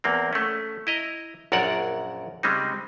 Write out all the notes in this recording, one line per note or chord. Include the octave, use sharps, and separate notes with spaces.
E2 A#3 C4
A3 C#4
E4 D#5 A#5
A#1 F#2 A#4 C#5 D5 F#5
C#3 G3 G#3 C4 D#4